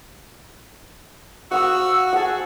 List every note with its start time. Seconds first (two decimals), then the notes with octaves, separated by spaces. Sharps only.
1.52 F#4 F5 F#5 D#6 E6
2.13 G#4 F#5 A5